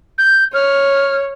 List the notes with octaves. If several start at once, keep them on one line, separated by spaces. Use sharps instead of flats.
G6
C#5 F6